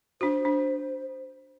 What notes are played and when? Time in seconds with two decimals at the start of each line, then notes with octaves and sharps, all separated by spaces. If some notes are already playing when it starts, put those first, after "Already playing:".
0.21 D4 F#4 C5
0.45 D4